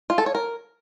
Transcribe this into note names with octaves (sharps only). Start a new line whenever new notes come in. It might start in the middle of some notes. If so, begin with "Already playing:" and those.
F4
A4
C#5
A#4